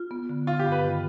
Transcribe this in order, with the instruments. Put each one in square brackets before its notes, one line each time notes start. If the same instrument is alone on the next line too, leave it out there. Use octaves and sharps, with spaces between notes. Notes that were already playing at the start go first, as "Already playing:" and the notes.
Already playing: [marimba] F4
B3
D3
[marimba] D3 [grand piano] F4
[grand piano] G4
[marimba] G2
[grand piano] B4
[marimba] D#3